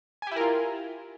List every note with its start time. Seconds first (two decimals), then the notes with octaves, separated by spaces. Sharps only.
0.22 G#5
0.27 G4
0.32 E4
0.36 A#4
0.41 F4